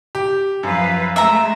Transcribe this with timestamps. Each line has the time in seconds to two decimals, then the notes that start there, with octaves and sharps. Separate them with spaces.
0.15 G4
0.63 F#2 F3 B4 F5
1.16 G#3 A3 E5 A#5